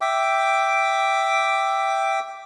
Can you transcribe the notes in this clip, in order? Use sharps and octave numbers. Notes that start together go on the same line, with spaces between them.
E5 G5 D6